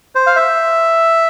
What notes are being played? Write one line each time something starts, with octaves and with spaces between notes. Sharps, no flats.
C5
F5
E5